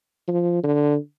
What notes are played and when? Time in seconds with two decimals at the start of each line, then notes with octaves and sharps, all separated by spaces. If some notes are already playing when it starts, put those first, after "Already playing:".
0.28 F3
0.64 D3